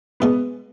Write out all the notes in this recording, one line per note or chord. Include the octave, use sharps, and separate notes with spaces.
B2 G#3 B3